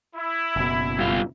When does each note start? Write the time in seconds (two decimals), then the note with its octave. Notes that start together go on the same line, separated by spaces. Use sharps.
0.15 E4
0.56 F#1 B2
0.99 G2 F4